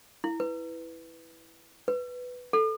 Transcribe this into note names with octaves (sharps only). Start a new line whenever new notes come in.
E4
B4
B4
A4